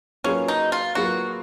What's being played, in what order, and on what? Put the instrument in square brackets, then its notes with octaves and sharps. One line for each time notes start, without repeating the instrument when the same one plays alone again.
[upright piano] F#3 A#3 F4 G#4 B4 [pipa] C#4
[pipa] D#4
F4
[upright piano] F#3 A#3 F4 G#4 B4 [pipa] F#4